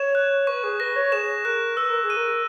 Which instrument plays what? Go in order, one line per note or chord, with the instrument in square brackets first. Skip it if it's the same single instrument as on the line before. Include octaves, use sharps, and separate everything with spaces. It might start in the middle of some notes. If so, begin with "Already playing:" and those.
Already playing: [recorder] C#5 [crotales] E7
[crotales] F#6
[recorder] B4 [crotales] C#6
[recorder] G#4
[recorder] B4 [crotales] A#6
[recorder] C#5
[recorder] G#4 [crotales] E7
[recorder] A#4 [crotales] F#6
[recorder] B4 [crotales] E6
[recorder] A#4
G#4
[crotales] D#7
[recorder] A#4